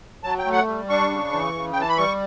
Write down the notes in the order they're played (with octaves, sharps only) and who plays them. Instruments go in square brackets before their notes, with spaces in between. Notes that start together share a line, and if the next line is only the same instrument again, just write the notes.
[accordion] F#3 A5
G5
A3
F#5
G3
D4 C#6
C#3
E3
C#3
G5
E3 A5
B5
G3 C#6